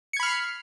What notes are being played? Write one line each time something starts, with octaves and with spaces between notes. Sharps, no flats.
B5 F6 G#6 C7 C#7